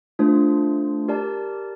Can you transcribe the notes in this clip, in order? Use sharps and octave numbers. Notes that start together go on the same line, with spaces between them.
A3 D4 F4 C5
G4 A#4 D5 A5